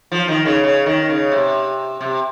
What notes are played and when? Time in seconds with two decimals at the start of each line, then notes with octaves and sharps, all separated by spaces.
0.12 F3
0.28 D#3
0.45 C#3
0.63 C#3
0.86 D#3
1.09 C#3
1.32 C3
2.01 C3